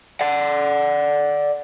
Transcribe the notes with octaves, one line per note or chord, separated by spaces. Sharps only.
D5 F#5